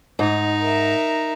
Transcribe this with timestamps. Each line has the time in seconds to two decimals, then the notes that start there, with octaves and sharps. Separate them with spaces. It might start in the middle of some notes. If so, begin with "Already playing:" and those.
0.19 G#2 D#4
0.61 A#4 E5